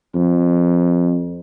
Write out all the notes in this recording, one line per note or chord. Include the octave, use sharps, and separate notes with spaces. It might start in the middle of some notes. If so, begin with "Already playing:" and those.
F2